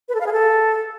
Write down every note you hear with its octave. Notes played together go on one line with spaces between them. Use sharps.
B4
A4
F5
G#4
A4